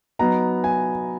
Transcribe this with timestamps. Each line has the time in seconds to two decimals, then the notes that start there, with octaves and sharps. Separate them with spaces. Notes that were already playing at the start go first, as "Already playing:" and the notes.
0.19 F#3 B3 D#4 A#5
0.64 G#5